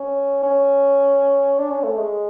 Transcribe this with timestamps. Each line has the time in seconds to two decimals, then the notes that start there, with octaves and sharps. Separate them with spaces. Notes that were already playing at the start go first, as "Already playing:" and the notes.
Already playing: C#4
0.43 C#4
1.59 D4
1.71 C#4
1.84 A3
1.97 G#3